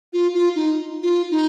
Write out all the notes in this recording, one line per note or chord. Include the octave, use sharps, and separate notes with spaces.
F4
F4
D#4
F4
D#4